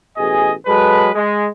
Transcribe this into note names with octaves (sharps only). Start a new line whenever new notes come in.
A1 B2 G#4 D#5 G#5
F#3 G#3 A4 B4
G#3